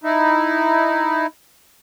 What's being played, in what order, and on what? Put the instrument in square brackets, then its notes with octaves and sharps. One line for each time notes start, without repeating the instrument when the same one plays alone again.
[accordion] D#4 E4